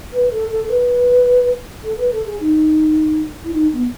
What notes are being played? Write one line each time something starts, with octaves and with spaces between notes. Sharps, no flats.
B4
A4
A4
A4
B4
A4
B4
A4
G#4
D#4
E4
D#4
B3